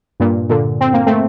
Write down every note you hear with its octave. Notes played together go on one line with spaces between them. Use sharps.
G2 A#2
A#2 D3
C4
A#3
A3 C4